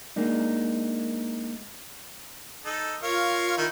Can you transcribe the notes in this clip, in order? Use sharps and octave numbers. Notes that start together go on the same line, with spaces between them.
G#3 A#3 D4 D#4
D#4 A4
F4 A#4 C#5 F5
D#3 D#4 E4